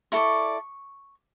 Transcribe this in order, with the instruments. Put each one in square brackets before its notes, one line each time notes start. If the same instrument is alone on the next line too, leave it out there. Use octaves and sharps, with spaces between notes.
[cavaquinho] E4 A4 D5 C#6